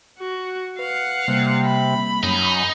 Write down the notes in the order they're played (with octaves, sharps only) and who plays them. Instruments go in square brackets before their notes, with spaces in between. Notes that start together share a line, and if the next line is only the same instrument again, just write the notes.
[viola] F#4
[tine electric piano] B4 [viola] F5 F#5
[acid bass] C3 [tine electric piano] G3 A#3 C4
[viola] B5
[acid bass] F#2 [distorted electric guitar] D#4